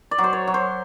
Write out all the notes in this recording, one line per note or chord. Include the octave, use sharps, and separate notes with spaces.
D5
F#3
C5
C#5
F#3
C5